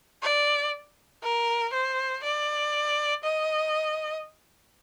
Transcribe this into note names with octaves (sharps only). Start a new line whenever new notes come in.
D5
A#4
C5
D5
D#5